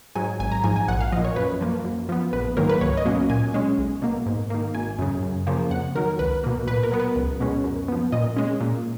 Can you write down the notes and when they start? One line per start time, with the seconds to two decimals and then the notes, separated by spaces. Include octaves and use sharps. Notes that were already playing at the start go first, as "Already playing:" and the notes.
0.15 G#2 F#3 G#5
0.40 G#1 G#5
0.52 A#5
0.64 G#2 F3 G#5
0.76 G#5
0.88 A#1 F#5
1.01 F5
1.12 A#2 F3 D#5
1.24 C#5
1.36 F#2 B4
1.61 F3 A#3
1.85 F#2
2.09 F3 B3
2.33 A#1 B4
2.57 G#2 D#3 F#3 A#3 A#4
2.69 B4
2.81 C#2 C#5
2.97 D#5
3.05 B2 F#3 A#3 C#4
3.30 A#2 G#5
3.54 G#3 C#4
3.78 B1
4.02 B2 A#3
4.26 G#2
4.50 D#3 A#3
4.74 G#1 G#5
4.99 F#2 C#3
5.23 F#2
5.47 C#3 F3 A#3
5.71 F2 F#5
5.95 D#3 F#3 A#4
6.19 C#2 B4
6.44 B2 A#3
6.67 A#2 B4
6.83 A#4
6.92 F#3 B3
7.00 B4
7.16 C#2
7.40 B2 G#3 C#4
7.64 F#2
7.88 F3 B3
8.12 A#2 D#5
8.37 G#3 C#4
8.61 A#2